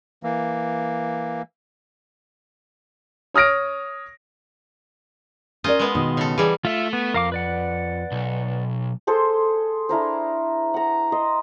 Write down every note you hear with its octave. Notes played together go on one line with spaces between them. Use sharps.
E3 A#3
C#5 D#6 F6 A#6 D7
C#4 F4 A#4 D5 D#5
G#3 B3
B2 D#3 D#4
C#3 A4
E3 G3 G#4
A3 F4 E5
B3
F2 A#4 F5 D6
B4 D5 F#5
B1
G#4 A4 C5 C6
D4 E4 A#4 C5
F#5 A#5
D#5 C6